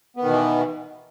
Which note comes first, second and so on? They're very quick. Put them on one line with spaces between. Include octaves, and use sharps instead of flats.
B3 D#3 B2 E3